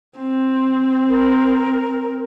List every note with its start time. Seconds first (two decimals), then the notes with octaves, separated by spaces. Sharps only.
0.17 C4
1.09 A#4